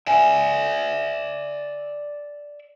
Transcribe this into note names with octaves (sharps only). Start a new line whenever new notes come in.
D5 E5 G#5